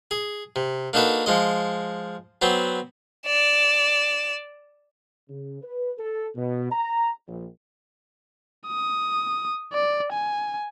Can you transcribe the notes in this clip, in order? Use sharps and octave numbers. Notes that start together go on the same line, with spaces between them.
G#4
C3
A#3 D4 D#4 F#4 A4 B4
F3 G#3 D#5
F#3 B3 C4 C5
D5 E7
C#3
B4
A4
B2
A#5
A#1
D#6
D5
G#5